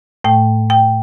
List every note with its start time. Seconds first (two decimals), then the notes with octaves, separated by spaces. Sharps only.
0.24 A2 A3 G5
0.70 G5